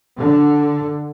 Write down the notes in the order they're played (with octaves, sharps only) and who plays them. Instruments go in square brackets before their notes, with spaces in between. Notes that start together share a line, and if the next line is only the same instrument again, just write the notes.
[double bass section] D3